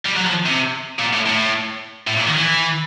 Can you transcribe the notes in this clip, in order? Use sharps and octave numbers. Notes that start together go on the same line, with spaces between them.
G3
F#3
F3
C3
A#2
A2
A2
A2
A#2
D#3
E3